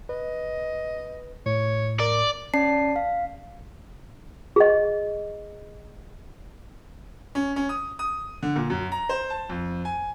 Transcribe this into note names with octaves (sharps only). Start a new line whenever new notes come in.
B4 D#5
A2 C#5
A#4 D5
C#4 D5 A5 C7
F5
G#4 D#5
C#4
C#4
D#6
D#6
D3
A#2
F#2
A#5
C5
A5
F2
G#5